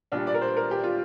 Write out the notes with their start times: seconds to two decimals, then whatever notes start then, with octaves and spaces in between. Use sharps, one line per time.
0.12 A#1 A#2 G3 D4
0.27 D5
0.34 A#4
0.42 C5
0.56 A#4
0.71 G4
0.84 F4